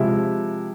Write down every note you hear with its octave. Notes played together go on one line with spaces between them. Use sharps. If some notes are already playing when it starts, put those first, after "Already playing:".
Already playing: C3 F3 G#3 E4